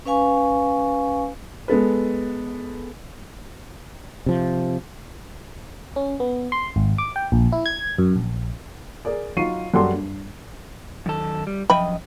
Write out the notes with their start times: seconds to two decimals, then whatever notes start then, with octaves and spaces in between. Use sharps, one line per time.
0.05 C#4 B4 F5 G#5 C#6
1.68 G#3 B3 A4 B4
4.26 C3 F3
5.96 C#4
6.20 B3
6.52 C6
6.76 G#1
6.98 D6
7.16 G5
7.32 A#1
7.52 E4
7.66 G#6
7.98 F#2
8.16 A#1
9.05 G#4 A#4 D5
9.37 F#3 D#4 F4 C#6 C7 D#7
9.74 F#2 G3 F#4 G4 A4 C6
9.94 G2
11.06 F#2 D#3 A4
11.47 G3
11.70 F#2 F3 D#5 E5 G5 B5